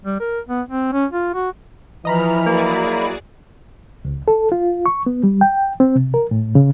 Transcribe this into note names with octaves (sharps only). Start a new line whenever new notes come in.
G3
A#4
B3
C4
C#4
F4
F#4
E3 F3 D#5 A#5 B5 F6
F#3 A#3 E4 F#4 G#4 D5
C#2
A4
F4
C#6
B3
G3
G5
C4
C3
A#4
A2
C#3